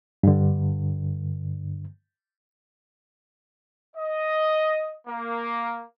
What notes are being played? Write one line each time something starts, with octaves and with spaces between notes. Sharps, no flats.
G2 D3
D#5
A#3